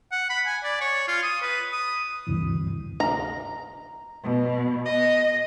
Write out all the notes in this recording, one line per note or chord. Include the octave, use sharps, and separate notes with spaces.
F#5
B5
G#5
D5
C#5
F4
D#6
B4
D#6
D2 G2 C3 E3
A#5
B2
D#5